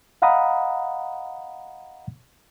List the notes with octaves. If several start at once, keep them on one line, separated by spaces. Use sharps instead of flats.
D#5 F5 F#5 A#5 B5 D#6